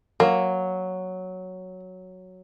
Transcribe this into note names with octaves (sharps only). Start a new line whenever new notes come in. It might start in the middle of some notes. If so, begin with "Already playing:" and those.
F#3 A#3